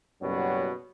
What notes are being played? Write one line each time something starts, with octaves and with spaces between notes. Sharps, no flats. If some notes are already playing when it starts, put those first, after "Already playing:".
F#1 F#2 B2 G3 F#4 C#5